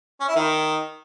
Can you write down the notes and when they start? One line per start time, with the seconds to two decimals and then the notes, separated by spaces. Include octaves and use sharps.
0.21 C#4
0.28 E4
0.36 D#3